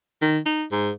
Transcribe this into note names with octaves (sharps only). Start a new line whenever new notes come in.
D#3
D#4
G#2